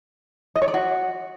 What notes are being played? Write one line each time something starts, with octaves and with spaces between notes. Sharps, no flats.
D#5
C#5
D5
F#4